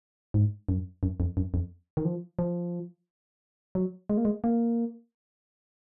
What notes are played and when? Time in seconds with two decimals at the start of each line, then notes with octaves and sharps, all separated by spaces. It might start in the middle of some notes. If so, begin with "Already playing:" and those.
0.34 G#2
0.69 F#2
1.03 F#2
1.20 F2
1.37 F#2
1.54 F2
1.97 D#3
2.05 F3
2.39 F3
3.75 F#3
4.10 G#3
4.17 A#3
4.25 G#3
4.44 A#3